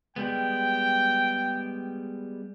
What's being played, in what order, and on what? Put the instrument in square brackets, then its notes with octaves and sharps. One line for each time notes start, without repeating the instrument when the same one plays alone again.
[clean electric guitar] G3 G#3 B3 [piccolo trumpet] G5